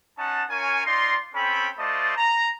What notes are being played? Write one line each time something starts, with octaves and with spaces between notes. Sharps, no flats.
C#4 D#4 F#5 A5
C#4 F4 A#4 C#5 G#5
D#4 F4 D5 A#5 C6
C4 C#4 A4 G5 B5
A3 F4 C5 D5 D#5 A5
A#5